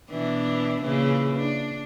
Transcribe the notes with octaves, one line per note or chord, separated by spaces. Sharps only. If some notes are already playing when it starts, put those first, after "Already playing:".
B2 E3 D4
A#2 C#3 E3
D4